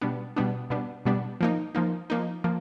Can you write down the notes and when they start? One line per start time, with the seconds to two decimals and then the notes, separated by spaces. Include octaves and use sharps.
0.01 B2 G3 B3 D4
0.36 B2 G3 B3 D4
0.70 B2 G3 B3 D4
1.05 B2 G3 B3 D4
1.41 F3 A#3 D#4
1.75 F3 A#3 D#4
2.10 F3 A#3 D#4
2.44 F3 A#3